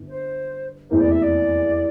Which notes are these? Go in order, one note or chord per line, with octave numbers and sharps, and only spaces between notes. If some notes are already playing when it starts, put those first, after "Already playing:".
Already playing: G1 G2 D3
C5
F1 E2 E3 A#3 C5
D5
E5
D5